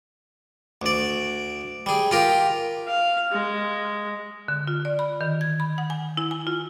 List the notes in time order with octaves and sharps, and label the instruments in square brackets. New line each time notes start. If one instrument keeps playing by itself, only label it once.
[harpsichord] D2 D5
G3 G#4
F4 G4 A#4
[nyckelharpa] F5
G#3
[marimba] D3
F4
D5
B5
D#3
G#6
B5
F#5
G#5
E4
G#5
F4